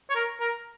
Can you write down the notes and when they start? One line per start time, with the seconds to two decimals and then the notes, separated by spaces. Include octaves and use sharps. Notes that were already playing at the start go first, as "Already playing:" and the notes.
0.10 C#5
0.15 A#4
0.40 A#4